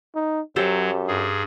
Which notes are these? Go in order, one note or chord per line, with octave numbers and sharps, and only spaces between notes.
D#4
F#2 F#3 G4 A4 C5
G2 G#4